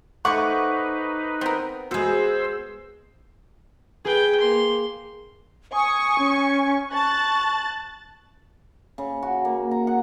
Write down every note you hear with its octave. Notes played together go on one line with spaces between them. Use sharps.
A3 D#4 B4 C5 F#5 G#5 C#6 D6
B3 C4 A#4
G#3 B3 F#4 G#4 C5 E6
G#4 B4 G5
A#3 C6
G#5 C#6 D#6
C#4
A5 C#6 F#6 A6
C#3
F#4
A#3
A#5
F#5